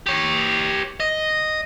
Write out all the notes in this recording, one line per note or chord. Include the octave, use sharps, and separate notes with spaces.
G4 C#5
D#5